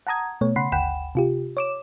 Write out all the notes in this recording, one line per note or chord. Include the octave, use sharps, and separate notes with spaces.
F#5 A5 A#5 D#6 G#6
B2 A3 B3 C#5
C#3 F#5 B5 C6 C7
G1 D2 F#5 G5 B5 E7
C3 F4 G4
C#5 D6 E7